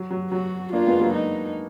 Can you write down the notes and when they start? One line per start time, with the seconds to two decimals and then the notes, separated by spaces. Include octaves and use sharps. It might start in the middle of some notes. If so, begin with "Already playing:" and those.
Already playing: F#3
0.11 F#3
0.31 F#3 F#4
0.73 A#3 D4 F4
0.87 G#3 B3
1.00 F#3 A#3
1.14 D#4